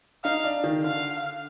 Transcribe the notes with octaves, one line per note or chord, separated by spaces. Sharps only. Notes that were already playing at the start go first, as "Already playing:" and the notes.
D#4 F5
D4
D#3
D3 F5